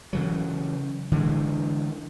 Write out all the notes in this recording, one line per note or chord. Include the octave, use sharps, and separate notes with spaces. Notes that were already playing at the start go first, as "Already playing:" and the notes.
C#3 E3 F#3
D3 E3 G#3